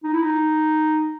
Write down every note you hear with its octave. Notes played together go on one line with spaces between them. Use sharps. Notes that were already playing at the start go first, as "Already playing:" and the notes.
D#4
E4
D#4